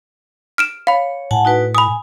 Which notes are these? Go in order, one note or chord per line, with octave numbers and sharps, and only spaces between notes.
F6 D7 E7
C#5 F5 B5
A2 F#5 G#5 A5
D#4 F#4 B4
G#5 B5 D#6